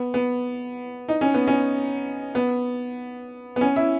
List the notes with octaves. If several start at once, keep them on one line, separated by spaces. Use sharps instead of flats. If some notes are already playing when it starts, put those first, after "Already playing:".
Already playing: B3
B3
D#4
C#4
B3
C#4
B3
B3
C#4
E4